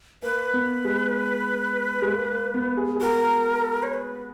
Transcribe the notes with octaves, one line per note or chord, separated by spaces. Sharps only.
A#3 B4
B3
G#3
G#3
A#3
A#3
B3
G#4
G#4
F#4 A#4
C#5
B4